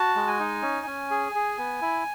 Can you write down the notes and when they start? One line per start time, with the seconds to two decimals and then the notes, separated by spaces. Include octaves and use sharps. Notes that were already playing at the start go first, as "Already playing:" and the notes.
Already playing: F#4 A5
0.15 G#3
0.27 G#5
0.39 D#4
0.62 C#4
0.87 C#4
1.11 G#4
1.35 G#4
1.58 B3
1.82 E4